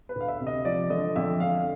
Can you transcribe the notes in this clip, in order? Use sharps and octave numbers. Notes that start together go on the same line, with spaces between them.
B4
D2
F5
E5
C3
D#5
F3 D5
D3 D#5
F2 E5
D3 F5